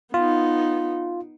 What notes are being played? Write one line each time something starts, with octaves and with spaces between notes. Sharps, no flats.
B3 D#4 F4